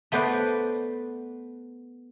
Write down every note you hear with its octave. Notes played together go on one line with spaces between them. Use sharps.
A3 B3 C5 D5 F#5 B5